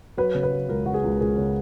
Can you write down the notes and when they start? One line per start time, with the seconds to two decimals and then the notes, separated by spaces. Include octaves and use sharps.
0.17 F#3 B4
0.35 C#3
0.43 B4
0.52 F#3
0.68 C#2 A#4
0.86 C#3 F#4
0.94 G#4
1.03 C#2
1.21 C#2 G#4
1.38 C#3